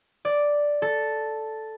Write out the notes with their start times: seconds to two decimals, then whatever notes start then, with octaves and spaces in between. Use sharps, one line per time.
0.25 D5
0.82 A4